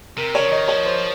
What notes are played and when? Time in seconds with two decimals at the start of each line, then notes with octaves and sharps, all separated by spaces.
0.17 C3 A#4
0.35 C#3 C#5
0.45 F3
0.52 D#3 D#5
0.68 F3 C#5
0.86 C5